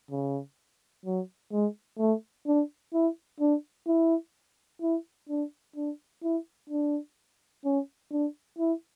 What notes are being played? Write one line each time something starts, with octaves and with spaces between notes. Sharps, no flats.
C#3
F#3
G#3
A3
D4
E4
D4
E4
E4
D4
D4
E4
D4
C#4
D4
E4